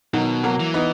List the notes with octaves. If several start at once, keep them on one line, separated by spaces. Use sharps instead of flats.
B2 D#3 F#3
F#3 A#3
E3
B3 D#4